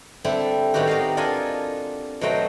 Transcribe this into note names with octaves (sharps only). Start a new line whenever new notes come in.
D3 G3 C4 E4 G4 A4
A2 D#3 B3 C4 F#4 G4
A#4 D#5 F5
D4 F4 A4 A#4 D#5 G#5
B2 F#3 A3 C5 G5 A#5